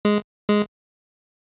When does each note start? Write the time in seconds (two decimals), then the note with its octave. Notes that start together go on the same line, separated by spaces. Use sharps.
0.05 G#3
0.49 G#3